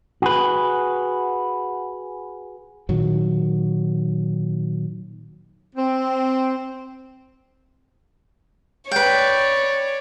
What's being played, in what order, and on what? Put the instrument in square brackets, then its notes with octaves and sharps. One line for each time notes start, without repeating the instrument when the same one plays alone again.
[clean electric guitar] F#4 G#4 B4
[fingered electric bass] A#2 D#3 F#3
[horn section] C4
[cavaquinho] B4 G5 [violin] C#5 D5